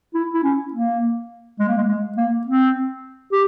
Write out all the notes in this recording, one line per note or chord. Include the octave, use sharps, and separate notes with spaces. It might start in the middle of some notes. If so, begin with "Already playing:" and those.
E4
E4
C#4
A#3
G#3
A#3
G#3
G#3
A#3
C4
G4